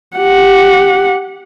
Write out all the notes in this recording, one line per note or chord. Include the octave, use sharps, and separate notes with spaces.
G4 F#5